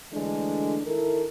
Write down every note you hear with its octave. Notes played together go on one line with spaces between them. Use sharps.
D3 E3 G#3 A3 D4
D#3 E4 A4 A#4